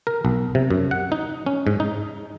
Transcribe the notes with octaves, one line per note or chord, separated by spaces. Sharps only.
A#4
B1
C3
F#2
F#5
D#4
C#4
G#2
D#4